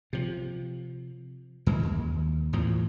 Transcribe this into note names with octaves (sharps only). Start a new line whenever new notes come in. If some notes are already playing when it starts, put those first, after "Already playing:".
C3 F3
F#2 E3 G#3
D#2
E2 A2 E3 F3